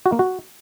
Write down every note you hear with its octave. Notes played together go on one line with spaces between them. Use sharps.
F#4
A#3
F#4